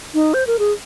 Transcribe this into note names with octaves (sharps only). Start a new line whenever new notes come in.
D#4
C5
A#4
G#4